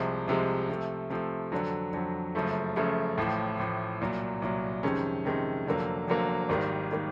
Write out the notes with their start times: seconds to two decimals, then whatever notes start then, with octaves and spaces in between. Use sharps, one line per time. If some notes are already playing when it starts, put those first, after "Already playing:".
Already playing: C2 C3 F3 G#3
0.28 C2 C3 F3 G#3
0.69 C3 F3 A3
1.10 C3 F3 A3
1.52 F2 D3 F#3
1.93 F2 D3 F#3
2.35 F#1 F#2 C#3 F3 A3
2.76 F#1 F#2 C#3 F3 A3
3.18 A1 A2 F3
3.59 A1 A2 F3
4.01 C2 A#2 F#3
4.42 C2 A#2 F#3
4.83 F2 C3 D#3 G#3 C#4
5.25 F2 C3 D#3 G#3 C#4
5.66 F1 F2 D3 F#3 A#3
6.07 F1 F2 D3 F#3 A#3
6.49 G#1 G#2 D#3 G3 A#3
6.92 D#3 G3 A#3